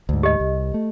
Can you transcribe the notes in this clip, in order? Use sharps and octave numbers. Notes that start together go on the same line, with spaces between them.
D2 G#2
G4 D#5
C2
A3